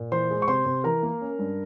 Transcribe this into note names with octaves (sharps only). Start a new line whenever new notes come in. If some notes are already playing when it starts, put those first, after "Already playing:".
Already playing: A#2
E3 C5 C6
G#3
C#6
C3 C5 C6
C3
E3 A#4 A#5
A#3
C#4
G2